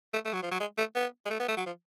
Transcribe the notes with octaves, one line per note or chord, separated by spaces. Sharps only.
A3
A3
F#3
F3
F#3
G#3
A3
B3
G#3
A3
B3
A3
F#3
F3